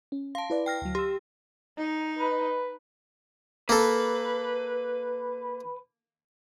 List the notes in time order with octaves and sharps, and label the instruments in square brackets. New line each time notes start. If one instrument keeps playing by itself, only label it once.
[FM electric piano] C#4
[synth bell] F5 A5 [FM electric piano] C6
[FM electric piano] E4 B4 D5
[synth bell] G5 F6 A#6
[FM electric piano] D2 F#3
[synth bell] G4 [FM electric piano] C6 E6
[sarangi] D#4
[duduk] B4
[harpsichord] A#3 A4 [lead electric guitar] B4